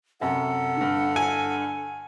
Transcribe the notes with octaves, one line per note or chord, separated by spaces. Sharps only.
F#2 C3 A4 F#5
G2 D3
G#5